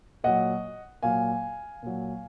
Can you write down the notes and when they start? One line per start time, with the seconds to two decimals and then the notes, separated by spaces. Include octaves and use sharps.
0.24 A#2 F#3 D#5 F#5
1.03 A#2 F#3 F5 G#5
1.83 A#2 F#3